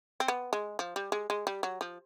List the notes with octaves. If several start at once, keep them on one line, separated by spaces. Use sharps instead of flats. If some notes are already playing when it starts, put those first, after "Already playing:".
C4
B3
G#3
F3
G3
G#3
G#3
G3
F#3
F3